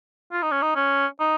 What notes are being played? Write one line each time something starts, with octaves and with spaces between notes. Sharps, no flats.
F4
D#4
C#4
D#4
C#4
D#4